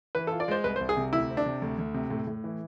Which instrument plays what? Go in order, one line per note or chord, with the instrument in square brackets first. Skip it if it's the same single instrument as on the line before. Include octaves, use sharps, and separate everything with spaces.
[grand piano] E3 [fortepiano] B4
[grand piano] F4 [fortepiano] A4
[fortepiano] D5
[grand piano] G#3 [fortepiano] C5
[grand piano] C2 [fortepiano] B4
[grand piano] C2 [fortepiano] C5
[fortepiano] G#4
[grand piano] C3
[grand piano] D2 [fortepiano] E4
[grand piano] C4
[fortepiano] D4
[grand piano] C3
D2
D2
C3
A2
A2
E3